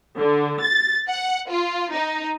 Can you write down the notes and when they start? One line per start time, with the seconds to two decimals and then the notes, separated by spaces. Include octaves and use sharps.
0.18 D3
0.62 A6
1.09 F#5
1.50 F4
1.93 D#4